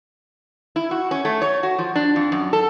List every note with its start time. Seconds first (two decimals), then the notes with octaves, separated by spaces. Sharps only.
0.76 E4
0.91 F#4
1.11 C#4
1.25 A3
1.42 C#5
1.63 F#4
1.79 F3
1.96 D4
2.16 F2
2.32 F#2
2.53 A4